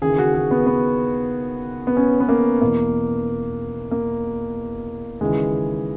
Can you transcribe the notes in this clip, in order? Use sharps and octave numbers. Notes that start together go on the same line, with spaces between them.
D#2 C#3 E3 G#4
F#4
G#4
B3
B3
B3
C#4
B3
A#3
E2 B2 A#3
A#3
D#2 C#3 E3 G#3